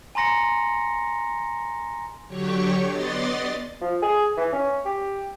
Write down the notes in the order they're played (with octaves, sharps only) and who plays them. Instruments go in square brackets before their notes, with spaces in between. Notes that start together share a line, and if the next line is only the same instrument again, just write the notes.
[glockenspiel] G#5 A#5 C6 A#6 C#7
[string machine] D3 F#3 G4 C#5 C#6
B3 D5 D#5 C6 A6
[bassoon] F3
G#4
E3
C#4
G4